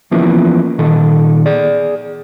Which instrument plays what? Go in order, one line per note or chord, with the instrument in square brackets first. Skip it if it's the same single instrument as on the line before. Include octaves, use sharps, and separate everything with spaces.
[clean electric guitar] E3 F3 A#3 B3 C#4 E4
A#2 D#3 A4
G#4 D5